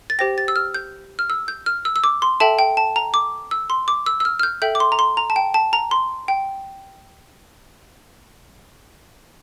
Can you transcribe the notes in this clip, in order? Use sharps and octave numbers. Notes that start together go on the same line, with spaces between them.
A6
G4 C5 G5 A#6
A6
E6
F6
G6
F6
E6
G6
F6
E6
E6
D6
C6
A4 E5 G5 A5
G5
A5
A#5
D6
E6
C6
D6
E6
E6
F6
F6
G6
A4 E5 G5 G6
D6
C6
A#5
C6
A#5
A5
G5
A5
A#5
C6
G5